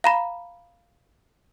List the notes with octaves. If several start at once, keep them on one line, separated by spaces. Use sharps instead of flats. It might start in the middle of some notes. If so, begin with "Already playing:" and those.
F5 A#5 B5